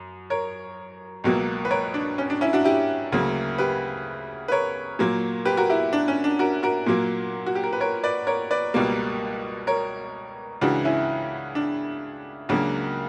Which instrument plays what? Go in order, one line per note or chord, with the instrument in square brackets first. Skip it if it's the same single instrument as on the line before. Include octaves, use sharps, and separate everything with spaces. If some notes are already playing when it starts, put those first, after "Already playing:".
Already playing: [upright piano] F#2
A#4 C#5
C#2 B2 F#3 A#3
B4
A#4 C#5
D4
C#4
D4
C#4 E4
D4 F#4
E4 G4
D2 C#3 F#3 A#3
G4 B4
B4
A#4 C#5
A#2 F#3 A#3
G4 B4
F#4 A#4
E4 G4
D4
C#4
D4
F#4 A#4
F#4 A#4
A#2 F#3 A#3
F#4
G4
A#4
B4
A#4 C#5
B4 D5
A#4 C#5
B4 D5
C#2 B2 G3 A#3
A#4 C#5
C#2 C#3 E3 D4 F#4
C#4 E4
D4
C#2 C#3 F#3 A#3 D4 F#4